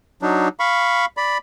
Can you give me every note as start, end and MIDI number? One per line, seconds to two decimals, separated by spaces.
0.22 0.48 54
0.22 0.48 62
0.22 0.48 63
0.60 1.05 77
0.60 1.05 83
0.60 1.05 85
1.17 1.38 74
1.17 1.38 83